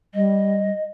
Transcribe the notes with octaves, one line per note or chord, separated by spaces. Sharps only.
G3 D#5